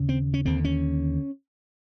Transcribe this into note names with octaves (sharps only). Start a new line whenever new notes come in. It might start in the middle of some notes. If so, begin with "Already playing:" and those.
Already playing: D#2 C#3
C4
C#4
D#2 D3 C4
C#4